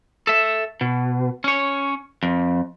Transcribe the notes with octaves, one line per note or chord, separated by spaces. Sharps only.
A4 E5
B2
C#4 C#5
F2